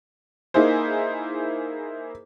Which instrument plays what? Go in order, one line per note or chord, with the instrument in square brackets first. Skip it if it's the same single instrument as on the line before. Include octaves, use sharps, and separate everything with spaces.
[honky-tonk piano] A#3 D#4 E4 G#4 C5